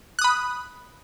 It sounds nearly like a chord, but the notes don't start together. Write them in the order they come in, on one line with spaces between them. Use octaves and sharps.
F#6 D#6 B5